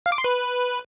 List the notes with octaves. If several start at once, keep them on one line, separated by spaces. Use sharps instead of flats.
F5
D6
C6
B4